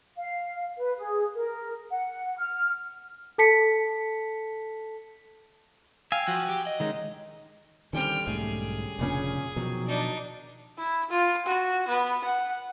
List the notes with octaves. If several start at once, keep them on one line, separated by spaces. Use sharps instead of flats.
F5
B4
G#4
A#4
F#5
F6
A4 A5 B6 C#7
F5 G5 G#5 E6
F3 F#4
G4
D#5
D#3 G#3 C#4 D#4
D3 D#3 G3 C4 C#4 G5 F6
B1 G#2 A3 G#4
F1 A#2 C#3 C#4 D4
B2 D#3 F3 F#3
D4 D#4
E4
F4
F#4
B3
F#5